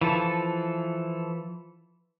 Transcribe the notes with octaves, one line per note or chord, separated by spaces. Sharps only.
E3 F3 A4